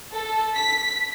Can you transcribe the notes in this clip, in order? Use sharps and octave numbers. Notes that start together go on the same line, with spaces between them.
A4
B6